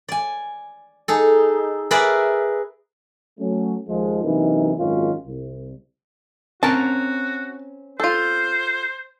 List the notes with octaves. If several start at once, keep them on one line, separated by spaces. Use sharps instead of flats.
D5 G#5
D#4 G#4 A4
G#4 A#4 B4 D5 E5
F#3 A3 C#4
D#2 F3 G#3
F#2 C3 E3 A#3 D#4
G#1 F#2 D#3 C#4 D#4 F4
C2
C4 C#4 F#4 A#4 A5
F4 A4 C5